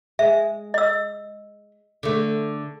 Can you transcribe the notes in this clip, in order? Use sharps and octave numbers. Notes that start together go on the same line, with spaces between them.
G#3 E5
D#5 E6
D3 A3